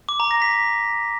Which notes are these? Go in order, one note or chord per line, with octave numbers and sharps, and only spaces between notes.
D6
A#5
A#6
B6